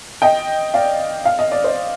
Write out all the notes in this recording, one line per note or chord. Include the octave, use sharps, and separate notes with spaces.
D#5 G5
D5 F5
F5
D#5
D5
C5 D#5